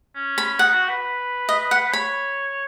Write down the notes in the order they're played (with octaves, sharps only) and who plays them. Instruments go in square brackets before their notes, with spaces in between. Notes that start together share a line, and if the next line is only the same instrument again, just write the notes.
[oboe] C#4
[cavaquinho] B5
[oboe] D#4 [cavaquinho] F#5
[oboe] F#4
B4
[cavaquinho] D#5
F#5
[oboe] B4
[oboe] C#5 [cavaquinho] B5